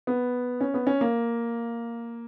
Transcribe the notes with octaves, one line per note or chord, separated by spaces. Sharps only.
B3
C#4
B3
C#4
A#3